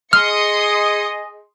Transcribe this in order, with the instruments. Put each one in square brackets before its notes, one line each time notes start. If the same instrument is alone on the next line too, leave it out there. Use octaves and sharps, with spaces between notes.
[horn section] G#4 D#5 [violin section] C6 D#6 C#7 [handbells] F6